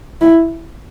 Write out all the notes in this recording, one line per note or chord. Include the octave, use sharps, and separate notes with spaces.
E4